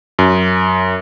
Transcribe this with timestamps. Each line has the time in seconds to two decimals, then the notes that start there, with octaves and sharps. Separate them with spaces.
0.19 F#2